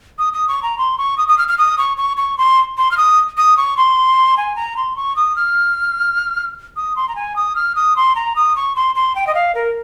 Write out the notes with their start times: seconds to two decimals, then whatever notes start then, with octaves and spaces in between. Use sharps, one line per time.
0.18 D#6
0.33 D#6
0.48 C#6
0.63 A#5
0.78 C6
0.98 C#6
1.18 D#6
1.28 D#6
1.38 F6
1.48 F6
1.58 D#6
1.78 C#6
1.97 C#6
2.17 C#6
2.38 C6
2.78 C6
2.91 F6
2.97 D#6
3.37 D#6
3.57 C#6
3.77 C6
4.37 G#5
4.56 A#5
4.77 C6
4.96 C#6
5.16 D#6
5.36 F6
6.76 D#6
6.96 C6
7.08 A#5
7.16 G#5
7.36 D#6
7.56 F6
7.75 D#6
7.96 C6
8.16 A#5
8.36 D#6
8.56 C#6
8.76 C6
8.95 C6
9.15 G5
9.27 D#5
9.35 F5
9.55 A#4